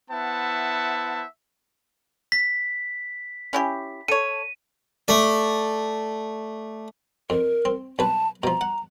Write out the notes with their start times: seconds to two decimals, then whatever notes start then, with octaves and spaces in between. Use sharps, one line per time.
0.11 B3 E4 C5 E5 F#5 A5
2.32 B6
3.53 C#4 E4 G4
4.08 A4 C#5 D#7
5.08 A3 D5
7.30 F2 A#4
7.65 C4
7.99 B1 B4 A5
8.43 B2 F3 A#5
8.61 F#5